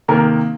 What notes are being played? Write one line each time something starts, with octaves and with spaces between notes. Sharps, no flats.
C3 D#3 A#3 A#4